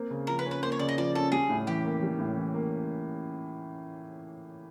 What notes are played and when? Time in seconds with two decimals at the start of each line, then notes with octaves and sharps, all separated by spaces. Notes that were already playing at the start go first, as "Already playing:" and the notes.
Already playing: A#3 C4
0.10 C#3
0.27 F3 A#4
0.39 B4
0.46 C#4
0.51 B4
0.62 A#3 C5
0.72 C#5
0.79 C#3 D5
0.89 D#5
0.97 F3 D5
1.15 C#4 A4
1.32 G3 G#4
1.49 A2
1.67 E3 G4
1.84 A#3
2.03 G3
2.19 A2
2.36 E3
2.54 A#3